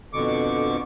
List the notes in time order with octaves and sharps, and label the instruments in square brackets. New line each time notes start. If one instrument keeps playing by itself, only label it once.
[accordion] F2 B2 D3 C#6 D6